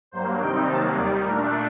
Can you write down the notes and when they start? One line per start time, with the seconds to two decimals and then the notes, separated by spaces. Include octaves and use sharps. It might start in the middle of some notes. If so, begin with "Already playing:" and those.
0.11 G2 F#3 A#3 C5
0.39 C3 D#3 G3 C4 D#4 G5
0.68 C3 D#3 F#3 A#3 A5
0.95 D#2 D#3 G3 D5
1.24 A#2 A3 D4 A#4